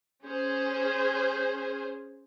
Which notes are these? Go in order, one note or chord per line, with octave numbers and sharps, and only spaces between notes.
C#4 G#4 C5